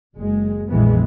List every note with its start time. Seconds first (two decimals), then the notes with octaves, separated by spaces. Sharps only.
0.16 F#1 G#3
0.68 A#1 F2 A#2 E3 G#3 B3